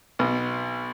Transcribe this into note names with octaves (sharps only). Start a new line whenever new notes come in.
B1 B2